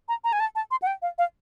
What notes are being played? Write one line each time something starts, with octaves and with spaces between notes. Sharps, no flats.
A#5
A#5
G#5
A5
A5
C6
F#5
G5
F5
F5